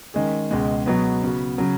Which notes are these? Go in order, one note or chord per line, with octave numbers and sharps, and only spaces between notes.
D#3 G#3 C#4 G#4
C#2 B2 G#3
B2 F#3 B3
C#3 B3 F#4
C#3 F#3